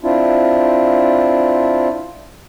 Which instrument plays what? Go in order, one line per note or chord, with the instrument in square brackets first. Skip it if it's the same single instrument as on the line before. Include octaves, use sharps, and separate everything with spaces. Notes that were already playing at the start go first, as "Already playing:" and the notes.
[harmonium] C4 D4 E4 F4